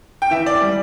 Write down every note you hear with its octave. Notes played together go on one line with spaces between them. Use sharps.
G5
E3 E5
D5
G3